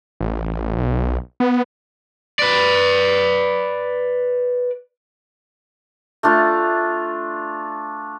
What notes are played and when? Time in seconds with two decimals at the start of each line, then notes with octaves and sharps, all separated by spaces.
0.20 A1
0.76 B1
1.40 B3
2.39 B4 D5
6.23 A3 D4 F4